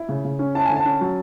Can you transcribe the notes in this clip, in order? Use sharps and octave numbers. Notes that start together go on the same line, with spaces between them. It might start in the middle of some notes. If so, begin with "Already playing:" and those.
Already playing: E4
C#3
C#3
C#4
E4 A5
D3 G#5
A5
C#4
F#3